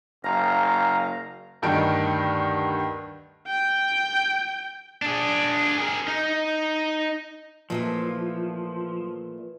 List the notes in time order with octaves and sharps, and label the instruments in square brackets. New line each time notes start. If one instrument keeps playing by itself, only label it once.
[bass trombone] F#1 [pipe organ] F5 A#5
[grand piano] D2 G2 D#3 D7
[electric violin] G5
[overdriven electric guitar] D4 G#4
G#4 A#4
D#4
[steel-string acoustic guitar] A#2 E3 A3 [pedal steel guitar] F3